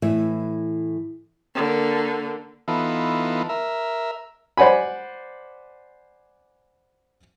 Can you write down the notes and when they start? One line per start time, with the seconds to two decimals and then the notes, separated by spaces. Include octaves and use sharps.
0.02 A2 E3 E5
1.55 D3 A#3
2.68 E3 B3 D#4 F4 A4
3.49 A#4 E5
4.57 C5 D5 F#5 G#5 B5